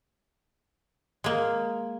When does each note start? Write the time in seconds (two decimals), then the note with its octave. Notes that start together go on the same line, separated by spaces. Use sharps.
1.24 G#3 A#3